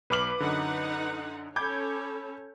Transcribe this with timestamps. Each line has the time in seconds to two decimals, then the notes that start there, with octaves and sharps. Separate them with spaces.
0.10 B1 B4 D6 F6 F#7
0.40 F#2 D3 D#4 F#5
1.56 C#4 A4 C#5 B5 D6 G6 G#6